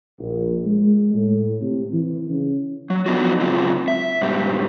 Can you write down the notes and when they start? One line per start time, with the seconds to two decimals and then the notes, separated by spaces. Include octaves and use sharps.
0.20 A#1
0.66 G#3
1.15 A2
1.62 C3
1.93 E3
2.30 C#3
2.90 F#3
3.06 F3 B3 D4 D#4 F4 F#4
3.40 C#3 F#3 G#3 C4 F4
3.88 E5
4.22 G#2 B2 G3